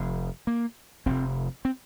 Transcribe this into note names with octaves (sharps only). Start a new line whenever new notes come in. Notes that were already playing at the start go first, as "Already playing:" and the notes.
Already playing: F1 F2 C3
A#3
F1 F2 C3 C4
C4